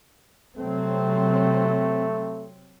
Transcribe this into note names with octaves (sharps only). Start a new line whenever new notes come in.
C3 F#3 A3 C4